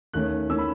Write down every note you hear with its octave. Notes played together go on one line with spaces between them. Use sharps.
D#2 D#3 A3 C#4 F#6
D#3 A3 C#4 E6
B5